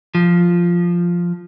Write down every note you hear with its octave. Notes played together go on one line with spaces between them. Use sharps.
F3